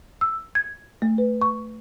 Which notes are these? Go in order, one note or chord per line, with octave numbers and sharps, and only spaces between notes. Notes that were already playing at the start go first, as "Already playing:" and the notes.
E6
G#6
A3
B4
C#6